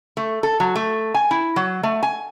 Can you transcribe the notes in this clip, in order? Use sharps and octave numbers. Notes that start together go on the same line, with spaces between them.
A3
A4
F#3
A3
G#5
E4
F#3
A3
G#5